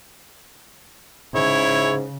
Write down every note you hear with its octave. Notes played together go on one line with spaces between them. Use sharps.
G#2 C#3 E4 C#5